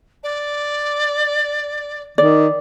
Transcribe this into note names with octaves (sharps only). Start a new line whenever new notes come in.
D5
D#3 D5